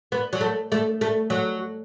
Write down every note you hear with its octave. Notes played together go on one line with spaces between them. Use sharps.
B3
F#3
A3
A3
A3
F#3